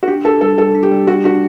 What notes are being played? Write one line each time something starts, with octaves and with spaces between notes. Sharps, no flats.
F#4
D4 G4
D4 A4
G3 A4
G3 A4
D4
G4
G3
F#4 G4
D4 F#4